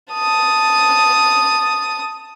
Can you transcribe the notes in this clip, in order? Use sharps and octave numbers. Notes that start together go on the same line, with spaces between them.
A5 D#6